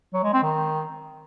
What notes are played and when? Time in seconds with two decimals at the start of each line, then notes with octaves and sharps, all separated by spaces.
0.13 F#3
0.23 G#3
0.33 C4
0.43 D#3